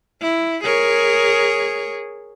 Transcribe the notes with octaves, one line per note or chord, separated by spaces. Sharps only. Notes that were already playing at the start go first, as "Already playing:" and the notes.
E4
G#4 A#4 C#5